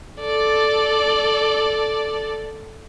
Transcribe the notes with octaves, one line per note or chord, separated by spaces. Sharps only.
A4 D5